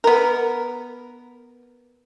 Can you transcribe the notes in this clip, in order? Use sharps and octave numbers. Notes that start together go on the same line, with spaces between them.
B3 A#4